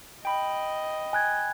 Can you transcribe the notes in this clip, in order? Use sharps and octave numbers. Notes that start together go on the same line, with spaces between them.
D#5 G5 B5
G#5 F#6 G#6